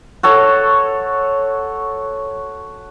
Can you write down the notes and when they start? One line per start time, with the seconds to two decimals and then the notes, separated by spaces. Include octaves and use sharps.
0.23 F#4 A4 C#5